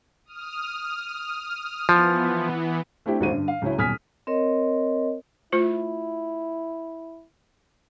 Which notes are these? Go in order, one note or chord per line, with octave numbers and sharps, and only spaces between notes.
D#6 F6
E3 F3 B3
A3 C4 D4 E4 G4
D#1 A1 G#2 F#4 C5 D#7
G2 D3
F5
C#2 F#3 C#4 E4
D#1 B1 G#5 D#6 F6 B6
C4 A#4 C#5 D#5
A3 E4 F4 C5